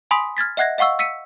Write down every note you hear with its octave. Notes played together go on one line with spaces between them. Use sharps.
G#5 B5 C6 D#6 B6
F6 G#6 A6 B6
D#5 E5 F#5 F#6 G#6 A#6
D#5 F5 F#5 C#6 E6
E6 B6 C#7 D#7